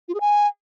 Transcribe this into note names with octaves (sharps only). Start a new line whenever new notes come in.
F4
G#4
G#5